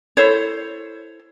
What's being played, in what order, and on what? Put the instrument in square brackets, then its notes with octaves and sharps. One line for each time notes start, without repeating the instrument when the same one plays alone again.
[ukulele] E4 A4 C5 C#5